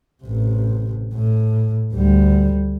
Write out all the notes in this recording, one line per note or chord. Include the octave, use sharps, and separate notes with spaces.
A1 C3
A2
D2 G3